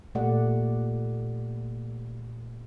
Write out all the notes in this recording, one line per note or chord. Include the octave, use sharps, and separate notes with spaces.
A#2 A3 G4 D5 F#5